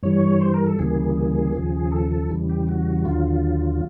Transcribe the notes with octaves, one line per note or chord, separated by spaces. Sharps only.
G2 E3 G3 C#5
C5
A#4
A4
D2 C#3 E3 G3 A#3 G#4
D#2 C#3 F3
A4
A4
E2 C#3 E3 G3
G4
F#4
D#2 D3 F#3 F4